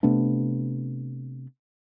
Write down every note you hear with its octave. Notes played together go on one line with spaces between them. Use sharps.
C3 A3 B3 D4